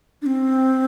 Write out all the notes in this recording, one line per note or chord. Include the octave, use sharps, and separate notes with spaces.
D4
C4